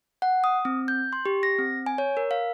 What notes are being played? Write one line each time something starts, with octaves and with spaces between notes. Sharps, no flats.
F#5
D#6
C4
G6
C6
G4
A#6
C4
G#5
C#5
A#4
F5